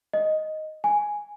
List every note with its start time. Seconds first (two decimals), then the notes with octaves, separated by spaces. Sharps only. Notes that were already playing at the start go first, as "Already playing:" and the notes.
0.13 D#5
0.84 G#5